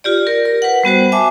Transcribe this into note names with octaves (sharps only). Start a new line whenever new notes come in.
F4 G4 D5
A#4
A#4
B4 F#5
G3 B3 F#4 C5
E5 G#5 A5 D6